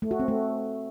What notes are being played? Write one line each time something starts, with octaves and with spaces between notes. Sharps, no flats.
A3
F#4
C4
A3